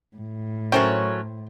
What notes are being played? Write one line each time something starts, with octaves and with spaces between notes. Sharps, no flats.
A2
F#3 A3 C#4 A#4 C5 C#5 G5